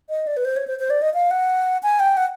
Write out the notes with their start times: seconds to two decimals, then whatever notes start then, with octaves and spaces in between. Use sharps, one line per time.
0.09 D#5
0.27 D5
0.37 B4
0.45 C5
0.56 C#5
0.67 C5
0.79 C5
0.90 D5
1.02 D#5
1.14 F5
1.31 F#5
1.83 G#5
2.00 G5
2.17 F#5